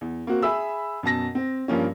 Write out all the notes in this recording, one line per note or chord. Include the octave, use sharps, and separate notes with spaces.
E2
A#3 C4 F#4
G#4 E5 B5 E6
F#2 B2 A5 A#6
C4
G2 F3 A#3 C#4